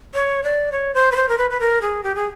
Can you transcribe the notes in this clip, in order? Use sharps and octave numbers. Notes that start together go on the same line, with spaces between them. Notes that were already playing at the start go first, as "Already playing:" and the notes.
C#5
D5
C#5
C5
B4
C5
A#4
B4
B4
A#4
G#4
G4
G#4